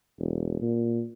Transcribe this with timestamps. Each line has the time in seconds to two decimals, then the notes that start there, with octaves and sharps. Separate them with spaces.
0.19 E1
0.61 A#2